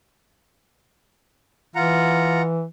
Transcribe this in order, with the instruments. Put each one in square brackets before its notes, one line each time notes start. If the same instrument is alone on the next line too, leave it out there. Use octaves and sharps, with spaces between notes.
[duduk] E3 [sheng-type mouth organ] F4 F#5 A#5